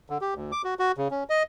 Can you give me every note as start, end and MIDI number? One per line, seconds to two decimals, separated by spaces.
0.10 0.18 50
0.21 0.34 67
0.35 0.52 38
0.52 0.62 86
0.64 0.74 66
0.79 0.92 66
0.97 1.08 49
1.11 1.24 61
1.30 1.43 75